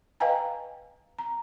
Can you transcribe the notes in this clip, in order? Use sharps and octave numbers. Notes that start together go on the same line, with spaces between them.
B4 D#5 F5 G5 G#5 A#5
A#5